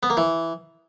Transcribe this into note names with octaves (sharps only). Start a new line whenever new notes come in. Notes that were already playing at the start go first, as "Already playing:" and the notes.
B3
A#3
E3